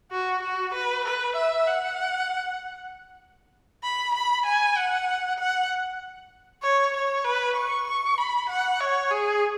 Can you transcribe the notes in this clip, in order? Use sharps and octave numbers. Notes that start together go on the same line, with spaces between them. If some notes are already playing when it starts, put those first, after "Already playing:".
F#4
F#4
B4
B4
E5
F#5
B5
B5
G#5
F#5
F#5
C#5
C#5
B4
C#6
C#6
B5
F#5
C#5
G#4